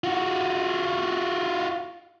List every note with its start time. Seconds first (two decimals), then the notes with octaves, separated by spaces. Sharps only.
0.04 F4 F#4